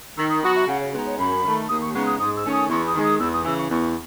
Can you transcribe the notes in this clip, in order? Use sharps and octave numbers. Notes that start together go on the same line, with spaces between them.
D#3 E6
D#6
F#3 B3 F#4 D#6
E5
C#3 F#5
C#5
G#3 B3 D#4 B4
C#5
F#2 B5
D#3 A3
D#2 D#6
C#6
C#3 G#3 B3 D#4 C#6
D#6
G#2 D#6
E6
D#3 A3 C#4
D#6
E2 C#6
D#6
D#3 G#3
D#6
E2 E6
D#6
C#3 E3 E6
C#6
E2 C#6